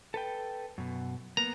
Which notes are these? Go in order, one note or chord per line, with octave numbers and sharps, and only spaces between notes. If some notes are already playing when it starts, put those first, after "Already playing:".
A4 B4 G5
F#2 B2
A#3 B3 A#5